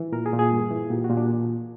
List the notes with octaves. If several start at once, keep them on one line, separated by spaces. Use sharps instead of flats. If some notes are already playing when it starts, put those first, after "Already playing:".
Already playing: E3
A#2 A#4
G#4
A#2
G#4
G2
E3
A#2 G4
F#4
A#2
D4